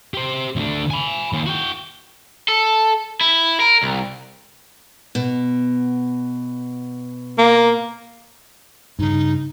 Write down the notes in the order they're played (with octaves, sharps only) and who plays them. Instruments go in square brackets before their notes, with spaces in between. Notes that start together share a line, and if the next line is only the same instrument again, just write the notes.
[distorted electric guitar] G4 C5
D2 D3
G#5 B5
D#2
F#4 G5
[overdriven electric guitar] A4
E4
A#4
C2
[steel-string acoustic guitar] B2
[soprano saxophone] A#3
[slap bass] G2 C#3 [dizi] D#4